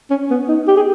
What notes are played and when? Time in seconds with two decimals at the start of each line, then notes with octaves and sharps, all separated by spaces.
0.11 C#4
0.31 B3
0.49 D#4
0.68 G4
0.77 G#4